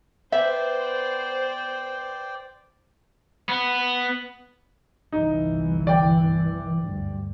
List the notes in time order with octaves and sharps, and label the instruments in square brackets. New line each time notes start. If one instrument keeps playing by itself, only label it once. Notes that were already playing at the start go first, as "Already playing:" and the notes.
[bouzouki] B3 B4 [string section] C5 [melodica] D5 G5 [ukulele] E5
[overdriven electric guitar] B3
[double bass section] G1 C2 E3 [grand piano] D#4
[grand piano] D5 G5
[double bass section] D2 G2